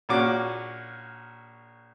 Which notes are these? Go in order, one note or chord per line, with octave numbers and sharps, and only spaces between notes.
A#1 A#2 C#4 F#4 D6